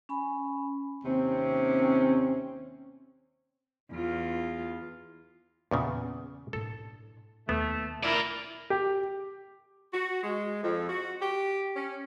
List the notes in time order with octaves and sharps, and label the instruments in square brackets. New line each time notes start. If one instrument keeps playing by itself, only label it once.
[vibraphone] C#4 G#5 B5
[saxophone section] D#2 C3 C4 C#4
[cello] E2 F4
[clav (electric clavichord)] E2 A#2 C#3 [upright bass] B3
[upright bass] A2 D4 [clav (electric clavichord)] A4
[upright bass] D#2 [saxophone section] A3 [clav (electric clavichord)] B3
[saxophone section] E4 [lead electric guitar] A#4 D5
[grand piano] G4
[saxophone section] F#4
G#3
F2
F#4
G4
C#4